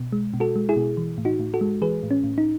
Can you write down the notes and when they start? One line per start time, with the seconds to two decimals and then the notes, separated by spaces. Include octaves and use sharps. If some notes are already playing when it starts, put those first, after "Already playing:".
Already playing: B2
0.13 G#3
0.34 B2
0.40 F#4 A4
0.56 G#3
0.69 E4 G#4
0.77 B2
0.97 E3
1.18 A2
1.25 D#4 F#4
1.40 A2
1.54 F#4 A4
1.61 G#3
1.82 E3 G#4 B4
2.03 A2
2.11 C#4
2.24 A2
2.38 D#4